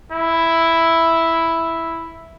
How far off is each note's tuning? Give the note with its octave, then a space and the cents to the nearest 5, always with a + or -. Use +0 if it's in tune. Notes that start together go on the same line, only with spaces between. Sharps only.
E4 +0